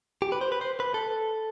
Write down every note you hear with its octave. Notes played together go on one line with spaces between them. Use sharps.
G4
B4
C5
B4
C5
B4
A4